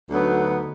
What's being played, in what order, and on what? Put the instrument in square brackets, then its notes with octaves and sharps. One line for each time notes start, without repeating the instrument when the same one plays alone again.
[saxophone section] D2 D3 F#3 B3 D#4